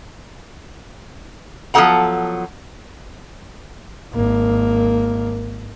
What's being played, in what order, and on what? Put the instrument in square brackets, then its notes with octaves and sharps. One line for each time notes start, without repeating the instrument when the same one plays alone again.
[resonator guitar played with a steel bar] F3 F#3 B3 A4 F#5 A#5
[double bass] G#1 A#3